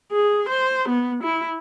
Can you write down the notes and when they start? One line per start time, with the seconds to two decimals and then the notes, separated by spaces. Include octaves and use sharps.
0.12 G#4
0.49 C5
0.89 B3
1.23 E4